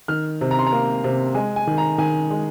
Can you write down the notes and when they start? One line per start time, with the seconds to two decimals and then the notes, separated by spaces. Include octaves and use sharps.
0.08 D#3 F6
0.41 C3
0.51 A#5
0.59 C6
0.67 A#5
0.72 A#3
1.04 C3
1.35 G#3 G#5
1.56 G#5
1.67 D#3
1.78 A#5
1.98 D#3 G#5
2.30 G#3